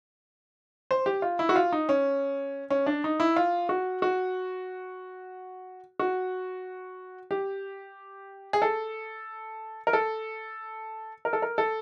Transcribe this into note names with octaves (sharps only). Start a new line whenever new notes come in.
C5
G4
F4
E4
F#4
F4
D#4
C#4
C#4
D4
D#4
E4
F4
F#4
F#4
F#4
G4
G#4
A4
A#4
A4
A#4
A4
A#4
A4